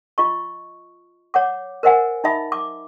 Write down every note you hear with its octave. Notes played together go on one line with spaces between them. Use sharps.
F4 D#5 C#6
C#5 F#5 D6
A#4 C5 D#5 F#5 G#5
D#4 D#5 E5 B5
D6